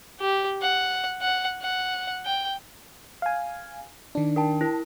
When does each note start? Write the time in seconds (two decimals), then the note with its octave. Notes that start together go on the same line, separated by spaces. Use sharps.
0.20 G4
0.62 F#5
1.21 F#5
1.61 F#5
2.26 G5
3.22 F5 G#5
4.15 D#3 D4
4.36 A#4 G5 A5
4.61 E4 A#4